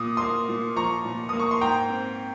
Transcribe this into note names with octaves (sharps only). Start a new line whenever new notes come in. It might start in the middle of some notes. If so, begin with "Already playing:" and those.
Already playing: A#2 D#6
A#3 C6 D#6
A#2
F3 A#5 C#6
A#2
A#3 D#6
C#6
C6
G#2 G5 A#5
C4